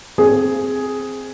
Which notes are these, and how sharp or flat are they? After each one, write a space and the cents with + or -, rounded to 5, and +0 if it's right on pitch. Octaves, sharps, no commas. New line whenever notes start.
C4 +0 G#4 +0